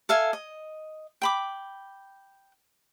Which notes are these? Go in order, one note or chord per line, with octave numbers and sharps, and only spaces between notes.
A4 E5 F5 G#5
D#5
G5 B5 D6